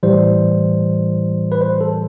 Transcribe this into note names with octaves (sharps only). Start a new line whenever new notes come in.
A2 E3 G3 C5
B4
C5
A4